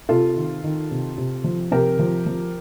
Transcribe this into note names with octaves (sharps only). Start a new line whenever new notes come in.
C3 F4 A4
D#3
D#3
C3
C3
F3
C3 G4 A#4
F3
F3